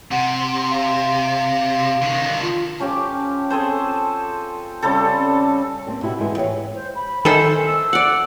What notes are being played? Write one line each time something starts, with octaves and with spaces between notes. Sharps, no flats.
C3 F#5
C6
F5
D3 D#3
F4
F3 C#4 G4 D6
C4 G#4 A4 C5
C#3 G3 C4 A4
G3 A#3 C4
B2 E4 F#4 G4
E2 G#2 G#3 B3 E4
E3 G4 C#5 D#5 F5
C5
B5
D#3 A4 C5 E5 G#5
E6
D5 F#5